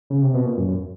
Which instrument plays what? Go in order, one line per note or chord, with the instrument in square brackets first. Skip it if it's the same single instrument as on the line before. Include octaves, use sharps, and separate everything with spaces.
[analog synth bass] C#3
C3
B2
A#2
F#2
F#2